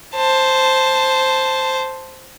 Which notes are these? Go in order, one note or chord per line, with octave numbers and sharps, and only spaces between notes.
C5 A5